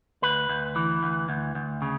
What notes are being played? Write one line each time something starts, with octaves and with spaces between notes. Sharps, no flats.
D2 B4
D2
E3
D2
D2
D2
C#3